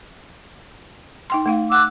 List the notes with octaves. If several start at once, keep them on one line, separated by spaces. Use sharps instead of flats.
D#4 G5 C6
A3 D#4 F5
F#5 D6 E6 F#6